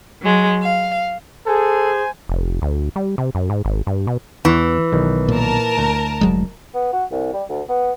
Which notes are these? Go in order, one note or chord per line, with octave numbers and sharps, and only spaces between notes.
F#3 G#3
F5
G#4 A4 C5 G#5
F1
D2
G3
C3
F#2
G#2
G#1
G2
B2
E2 E3
B1 D#3
A#2 A#4 A5
D2
F1 F#3 G#3
B3
F#4
C2
G3
D2
B3